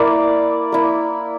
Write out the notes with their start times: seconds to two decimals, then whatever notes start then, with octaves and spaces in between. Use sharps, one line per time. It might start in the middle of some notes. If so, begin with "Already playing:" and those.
Already playing: A#3 E4 D5
0.72 A#3 E4